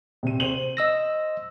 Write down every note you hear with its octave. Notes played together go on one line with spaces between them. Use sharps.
C3 D#7
C5 D#7 F#7
D#5 E6 A#6